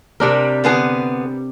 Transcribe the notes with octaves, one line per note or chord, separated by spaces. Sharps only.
C3 G3 D4 A#4
D3 B3 G#4